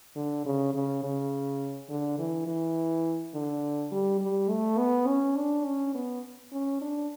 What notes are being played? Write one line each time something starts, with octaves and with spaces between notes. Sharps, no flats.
D3
C#3
C#3
C#3
D3
E3
E3
D3
G3
G3
A3
B3
C#4
D4
C#4
B3
C#4
D4